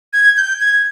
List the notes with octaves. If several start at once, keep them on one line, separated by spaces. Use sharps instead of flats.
G#6
G6
G#6